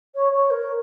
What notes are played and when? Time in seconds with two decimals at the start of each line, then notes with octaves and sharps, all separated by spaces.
0.15 C#5
0.32 C#5
0.50 A#4